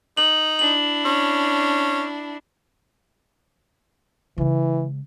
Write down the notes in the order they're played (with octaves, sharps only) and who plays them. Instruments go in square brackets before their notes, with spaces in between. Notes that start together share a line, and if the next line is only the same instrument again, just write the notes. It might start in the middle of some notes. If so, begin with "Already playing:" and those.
[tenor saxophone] D#4 [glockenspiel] F#7
[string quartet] D4 E4 [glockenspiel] F#7
[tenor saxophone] C#4
[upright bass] C#3 G#3 [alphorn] E3